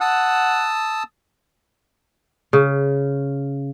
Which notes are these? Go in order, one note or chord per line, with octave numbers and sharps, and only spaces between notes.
F#5 A5 D#6 E6
C#3